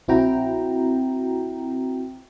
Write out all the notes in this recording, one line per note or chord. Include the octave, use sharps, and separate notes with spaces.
A#1 C4 E4 F#4 G5 A#5